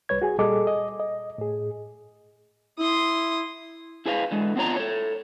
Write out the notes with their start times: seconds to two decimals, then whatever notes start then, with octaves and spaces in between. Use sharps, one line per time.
0.09 C2 G3 B4 C#5 G#6
0.22 F#4 G#4 G#5
0.38 A#2 G3 G#4 A4 D#5 D6
0.67 D#5
1.00 D#5
1.38 A2 G#4
2.79 E4 C6 D#6
4.06 E4 G#4 B4 D5 F5
4.31 D3 E3 G#3
4.56 B3 C4 D4 F4 C#5 A#5
4.76 A4 C#5